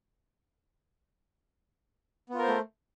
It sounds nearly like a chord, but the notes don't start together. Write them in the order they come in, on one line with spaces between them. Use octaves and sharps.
B3 F4 A#4 C5 A3